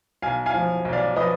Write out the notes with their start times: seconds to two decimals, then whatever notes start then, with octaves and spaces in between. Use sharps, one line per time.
0.22 B1 F5 G#5
0.46 F5 G#5
0.54 F3
0.85 B1
0.93 D5 F5
1.16 F3 B4 D#5